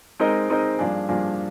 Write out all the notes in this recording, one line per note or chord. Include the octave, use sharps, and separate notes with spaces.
G#3 C4 D#4 A#4 D#5
G#3 C4 D#4 A#4 D#5
G2 F3 A#3 D4 G#4
G2 F3 A#3 D4 G#4